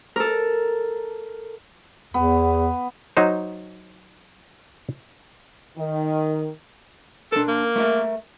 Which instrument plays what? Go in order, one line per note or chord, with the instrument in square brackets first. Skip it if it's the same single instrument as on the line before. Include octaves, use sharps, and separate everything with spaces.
[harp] A4 A#4
[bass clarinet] E2 [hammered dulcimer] B3
[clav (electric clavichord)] F#3 D#4 C5
[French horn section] D#3
[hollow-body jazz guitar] D4 A#4 [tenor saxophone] A4
[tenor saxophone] A#3
[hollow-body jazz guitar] A3 A#4 E5